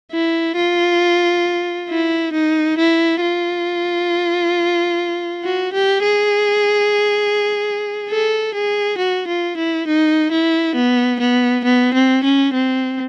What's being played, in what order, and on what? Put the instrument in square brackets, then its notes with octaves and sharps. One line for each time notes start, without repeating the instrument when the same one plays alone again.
[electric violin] E4
F4
E4
D#4
E4
F4
F#4
G4
G#4
A4
G#4
F#4
F4
E4
D#4
E4
B3
B3
B3
C4
C#4
C4